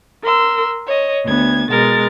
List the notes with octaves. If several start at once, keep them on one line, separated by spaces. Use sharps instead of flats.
A#4 C6 E6
C#5 D#5
D2 B3 G#6
B2 G#3 A#4 A6